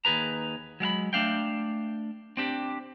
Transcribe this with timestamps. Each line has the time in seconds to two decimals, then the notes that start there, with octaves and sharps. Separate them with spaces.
0.05 D#2 D#3 G#4 B4 A#5
0.80 F#3 G#3 F5 B5
1.13 A3 D4 F5 G5
2.37 C4 D4 G4